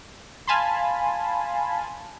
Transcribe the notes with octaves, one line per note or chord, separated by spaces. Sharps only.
F5 G#5 A5 B5 C6